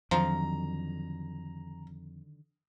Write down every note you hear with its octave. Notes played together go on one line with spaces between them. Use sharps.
F2 D3 D#3 F3 F#3 A#5